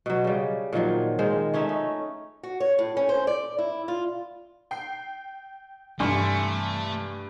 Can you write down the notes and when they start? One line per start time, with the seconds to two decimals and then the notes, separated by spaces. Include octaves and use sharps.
0.06 B2 F#3
0.24 C#3 G3
0.73 A#2 D#3 F3 F#3
1.19 D#3 G#3 C5
1.54 A3 C#4 D#4 E5
1.69 D#4
2.43 F#4
2.60 C#5
2.79 A2
2.97 C#4
3.09 C5
3.27 D5
3.58 E4
3.88 F4
4.71 G5 C7
6.00 G2 C3 E3 G3 A3 G#5 C6 C#6